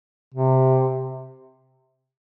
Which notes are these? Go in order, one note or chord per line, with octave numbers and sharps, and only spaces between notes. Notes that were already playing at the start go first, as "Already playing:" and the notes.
C3